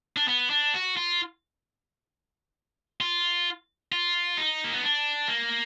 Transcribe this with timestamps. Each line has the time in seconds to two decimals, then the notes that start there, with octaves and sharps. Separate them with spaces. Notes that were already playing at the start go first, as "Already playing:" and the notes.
0.17 D4
0.28 B3
0.50 D4
0.74 F#4
0.97 F4
3.01 F4
3.92 F4
4.37 D#4
4.64 A#3
4.74 B3
4.83 D4
5.28 A#3